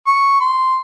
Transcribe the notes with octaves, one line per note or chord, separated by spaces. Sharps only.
C#6
C6